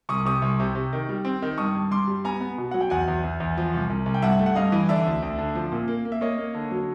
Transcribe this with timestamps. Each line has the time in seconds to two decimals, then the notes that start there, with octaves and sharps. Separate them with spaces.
0.09 C2 C#6 D#6
0.25 C3 C#6 D#6
0.42 C2
0.60 C3
0.75 C3
0.93 D#3
1.09 G3
1.25 C4
1.42 D#3
1.58 G2 C#6 D#6
1.75 G2
1.91 G2 C6 D6
2.07 G3
2.24 B3 G#5 A#5
2.40 B3
2.58 B2
2.71 F#3 F#5
2.81 G5
2.90 E2 F#5 G#5
3.08 E2
3.24 E2
3.40 E2
3.57 F3
3.74 C2
3.90 C2
4.06 C2
4.14 G5
4.22 G2 E5 F#5
4.39 A3
4.46 F#5
4.55 G2 D#5 F5
4.72 E3
4.89 D3 D5 E5
5.06 D2
5.22 D2
5.38 D3
5.55 F3
5.72 A#2
5.88 A#3
6.05 A#3
6.12 E5
6.21 A#3 C#5 D#5
6.38 A#3
6.54 D3
6.71 F#3